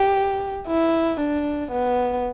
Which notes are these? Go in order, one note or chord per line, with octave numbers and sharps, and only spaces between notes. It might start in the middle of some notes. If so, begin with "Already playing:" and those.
Already playing: G4
E4
D4
B3